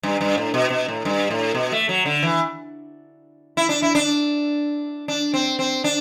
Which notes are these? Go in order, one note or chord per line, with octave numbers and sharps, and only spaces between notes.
G2
G2
A2
B2
B2
A2
G2
A2
B2
A3
F#3
D3
E3
E4
D4
E4
D4
D4
C4
C4
D4